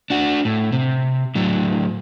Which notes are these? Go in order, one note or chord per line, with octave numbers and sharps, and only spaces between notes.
D4 F#4
A2
C3
A2 F#3